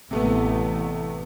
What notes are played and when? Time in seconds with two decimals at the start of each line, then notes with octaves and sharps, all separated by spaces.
0.11 A1 C3 A3 B3